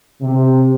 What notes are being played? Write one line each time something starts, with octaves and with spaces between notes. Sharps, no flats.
C3